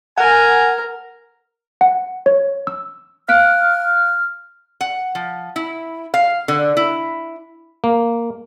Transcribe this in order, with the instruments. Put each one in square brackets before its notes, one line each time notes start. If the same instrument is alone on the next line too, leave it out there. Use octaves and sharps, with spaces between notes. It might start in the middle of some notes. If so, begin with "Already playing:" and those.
[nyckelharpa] A#4 [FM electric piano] F#5 [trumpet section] G#5
[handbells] F#5
C#5
E6
[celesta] F5 F#6 D7 [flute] F6
[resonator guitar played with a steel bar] F#5
F3
E4
F5
D3
E4
[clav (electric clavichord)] A#3